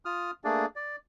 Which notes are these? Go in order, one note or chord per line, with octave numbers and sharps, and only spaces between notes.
F4 D#6 F6
A3 A#3 D4 G#4 D5
D5